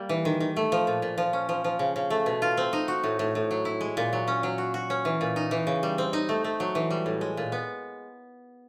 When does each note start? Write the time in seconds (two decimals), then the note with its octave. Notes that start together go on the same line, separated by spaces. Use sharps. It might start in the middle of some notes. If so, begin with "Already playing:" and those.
Already playing: G3 A#3
0.09 E3
0.25 D#3
0.40 D#3
0.56 A3
0.72 F3
0.87 A#2
1.02 A#2
1.18 F3
1.33 C#4
1.49 F3
1.64 F3
1.79 C#3
1.96 C#3
2.10 A3
2.26 B2
2.42 F4
2.57 C4
2.73 D#4
2.88 F#4
3.04 A2
3.19 A2
3.35 A2
3.51 F#3
3.65 E4
3.81 G#3
3.97 A#2
4.13 F#3
4.28 C#4
4.43 F#3
4.58 F#4
4.74 F#4
4.90 C#4
5.05 E3
5.21 A#2
5.36 D#4
5.51 E3
5.67 C#3
5.83 G3
5.98 C4
6.13 D#4
6.29 A3
6.44 A3
6.60 F#3
6.75 E3
6.90 G3
7.06 A2
7.21 G#3
7.37 A#2
7.52 B3